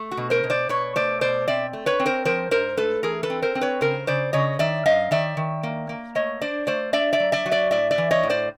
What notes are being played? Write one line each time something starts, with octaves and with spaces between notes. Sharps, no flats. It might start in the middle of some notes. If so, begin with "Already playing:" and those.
Already playing: A3
F#4
B2
A#4 C5
B2
C5 D5
B2 B4 C#5
A3 C5 D5
B2 C5 D5
C4 D5 E5
A3
B4 C#5
C4
A#4 C5
F3 A#4 C5
G#2 A#4 C5
A3 A4 B4
E3 G#4 A#4
A4 B4
C4
A#4 C5
C4
B4 C#5
C#3 A#4 C5
C#3 C5 D5
C#3 C#5 D#5
D#3 D5 E5
F#2 D#5 F5
D#3 D5 E5
D#3
A#3
A#3
A3 C#5 D#5
D4 C5 D5
A3 C5 D5
D4 D5 E5
D5 E5
F#3
D5 E5
F#3
D5 E5
A2 D5 E5
D5 E5
E3
C#5 D#5
A2
C5 D5